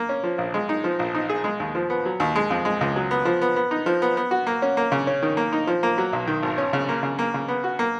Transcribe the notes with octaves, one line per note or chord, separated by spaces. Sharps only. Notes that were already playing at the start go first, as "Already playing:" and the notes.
Already playing: A#3
C#4
F3
A#1
G#3
D#4
F3
A#1
D#4
G#4
G#3
D#2
F3
B3
F#3
D#2
G#3
F2
G#3
C#2
F#3
B3
F3
B3
B3
D#4
F3
B3
B3
F#4
A#3
C#4
A#3
C#3
C#4
D#3
A#3
D#4
F3
A#3
F#3
B1
D#3
G#1
C#4
C#3
A#3
C#3
A#3
C#3
B3
F#4
A#3